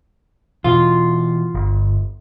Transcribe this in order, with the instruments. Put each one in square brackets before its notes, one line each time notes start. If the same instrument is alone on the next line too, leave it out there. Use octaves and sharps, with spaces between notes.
[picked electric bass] B2 E3 [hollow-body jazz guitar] F4
[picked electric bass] G1